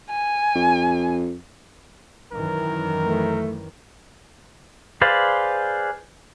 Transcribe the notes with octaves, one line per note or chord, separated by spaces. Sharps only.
G#5
F2
F#2 D#3 E3 A#4
A3
G#4 B4 C5 D5 F5